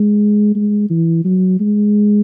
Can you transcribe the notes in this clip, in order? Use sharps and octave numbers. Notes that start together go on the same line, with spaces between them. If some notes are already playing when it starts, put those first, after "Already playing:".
Already playing: G#3
G#3
E3
F#3
G#3